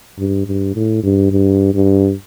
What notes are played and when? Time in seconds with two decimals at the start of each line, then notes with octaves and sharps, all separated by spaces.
0.18 G2
0.47 G2
0.75 A2
1.03 G2
1.31 G2
1.74 G2